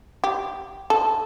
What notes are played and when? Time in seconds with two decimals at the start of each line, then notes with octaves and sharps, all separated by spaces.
0.24 G4
0.90 A4